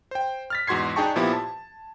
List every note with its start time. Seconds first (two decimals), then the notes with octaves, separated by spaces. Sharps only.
0.11 C5 G5
0.50 F6 A6 B6
0.67 E2 G#2 F#4 C6 G#6 C7
0.96 D4 D#4 G#4 G5 A5 C#6
1.16 A#2 F3 B3 E4 G4
1.33 A5